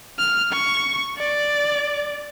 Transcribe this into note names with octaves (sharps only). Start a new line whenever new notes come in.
F6
C#6
D5